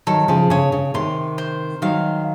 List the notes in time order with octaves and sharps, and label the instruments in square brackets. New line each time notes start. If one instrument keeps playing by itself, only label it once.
[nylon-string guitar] D#3 F#3 [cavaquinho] A4
[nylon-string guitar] C#3 F3
[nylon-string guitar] C#3 [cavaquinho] C#5
[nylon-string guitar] C#3
[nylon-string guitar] C3 D#3 [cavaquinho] C6
[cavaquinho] C5
[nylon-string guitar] D#3 F#3 [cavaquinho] F5